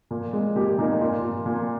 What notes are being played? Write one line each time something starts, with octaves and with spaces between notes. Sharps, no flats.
A#2
G#3
A#2 G4
A#2 D#4
A#2 F4
A#2
A#2